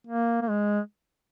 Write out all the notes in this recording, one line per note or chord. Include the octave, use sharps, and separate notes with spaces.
A#3
A#3
G#3